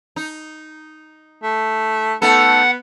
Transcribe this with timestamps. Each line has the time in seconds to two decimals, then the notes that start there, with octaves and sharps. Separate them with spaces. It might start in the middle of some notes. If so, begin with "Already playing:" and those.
0.16 D#4
1.43 A3
2.22 A3 B3 D#4 A4 F#5